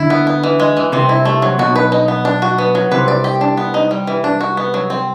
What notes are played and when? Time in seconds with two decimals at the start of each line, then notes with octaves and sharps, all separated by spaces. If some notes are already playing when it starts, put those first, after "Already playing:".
Already playing: D2 D3 E4
0.10 B3
0.27 B3
0.43 E3
0.60 G#3
0.77 E3
0.92 C2 C3 C4
1.09 E4
1.25 A3
1.42 F#3
1.58 B1 B2 F#4
1.76 B4
1.92 D#4
2.08 B3
2.25 D4
2.42 F#4
2.58 B3
2.75 F#3
2.91 C2 C3 B4
3.08 D5
3.24 G4
3.41 D4
3.57 B3
3.74 D#4
3.91 G3
4.07 E3
4.24 D4
4.41 F#4
4.57 B3
4.74 F#3
4.90 C4